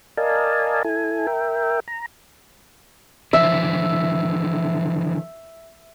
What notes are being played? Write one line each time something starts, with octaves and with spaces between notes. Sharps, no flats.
A#4 D5 D#5 F5 G#5 A5
E4 A4 G#5
A#4 E5 G5
A#5
D3 E3 F3 E5